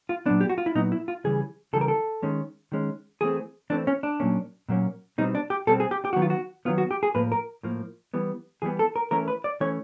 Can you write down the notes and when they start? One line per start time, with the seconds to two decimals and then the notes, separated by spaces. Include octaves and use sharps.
0.09 F4
0.26 A#2 F#3 B3 D4
0.41 G4
0.49 F#4
0.58 F4
0.66 E4
0.75 A#2 F#3 B3 D#4
0.92 E4
1.08 F4
1.24 C#3 E3 G3 G#4
1.73 C#3 E3 G3 A4
1.81 A#4
1.88 A4
2.22 D#3 G#3 C#4
2.72 D#3 G#3 C#4
3.21 E3 A3 C4 G#4
3.70 E3 A3 C4 D4
3.87 C#4
4.03 D4
4.20 A#2 F#3 A#3 C#4
4.69 A#2 F#3 A#3 C#4
5.18 B2 G3 C4 D#4
5.35 D4
5.50 G4
5.67 B2 G3 C4 A4
5.80 G#4
5.91 G4
6.05 G4
6.13 D#3 F#3 B3 F#4
6.22 F4
6.30 F#4
6.65 D#3 F#3 B3 F4
6.78 F#4
6.91 G4
7.03 G#4
7.14 A2 F3 A#3 B4
7.32 A#4
7.63 A2 F3 A#3
8.14 E3 G3 B3
8.62 E3 G3 B3 G#4
8.79 A4
8.96 A#4
9.11 E3 A3 C#4 A#4
9.28 B4
9.44 D5
9.60 E3 A3 C#4 C#5